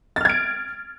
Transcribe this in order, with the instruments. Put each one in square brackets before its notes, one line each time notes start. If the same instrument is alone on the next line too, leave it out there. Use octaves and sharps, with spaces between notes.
[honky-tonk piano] A6
F6
G#6
D7